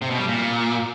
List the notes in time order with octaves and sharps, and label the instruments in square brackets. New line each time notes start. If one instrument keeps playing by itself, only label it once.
[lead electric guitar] C3
B2
G3
A#2